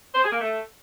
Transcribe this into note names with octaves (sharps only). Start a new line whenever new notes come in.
C5
G#4
A#3
A3